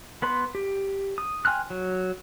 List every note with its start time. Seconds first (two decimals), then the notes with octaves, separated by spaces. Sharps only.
0.22 B3 B4 C6
0.55 G4
1.18 D#6
1.45 G5 G#5 C6 F6 F#6
1.70 F#3